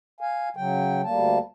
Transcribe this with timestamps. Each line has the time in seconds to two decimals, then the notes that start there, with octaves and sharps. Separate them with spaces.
0.21 F5 G#5
0.56 C#3 F#3 G5
1.04 D2 G3 A#3 A5